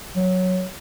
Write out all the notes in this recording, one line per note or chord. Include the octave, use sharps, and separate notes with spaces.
F#3